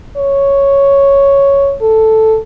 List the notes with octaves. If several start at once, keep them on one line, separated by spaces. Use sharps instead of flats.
C#5
A4